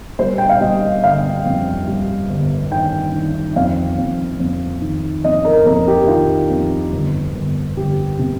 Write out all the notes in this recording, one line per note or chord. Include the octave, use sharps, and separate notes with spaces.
G3 C5
G5
F5
G3 D#5
G1 F5
F2
G3
G1
D#3 G5
D#3
F2 F5
F2
F2
D#3
F2 D#5
A#4
F2 A#4
G4
D#3 F4
F2
G1
G1
G1 G4
C3